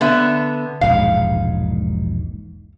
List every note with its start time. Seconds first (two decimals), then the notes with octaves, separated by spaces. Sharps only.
0.01 D3 B3 E5
0.81 E1 A#1 G#2 F5